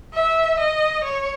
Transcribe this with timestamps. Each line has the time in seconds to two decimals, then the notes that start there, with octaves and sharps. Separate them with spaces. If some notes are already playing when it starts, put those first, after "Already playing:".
0.14 E5
0.59 D#5
1.04 C#5